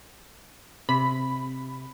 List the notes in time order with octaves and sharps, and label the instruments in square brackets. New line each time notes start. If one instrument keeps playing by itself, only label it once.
[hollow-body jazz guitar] C3 [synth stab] B5